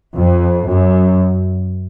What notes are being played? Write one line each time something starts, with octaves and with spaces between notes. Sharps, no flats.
F2
F#2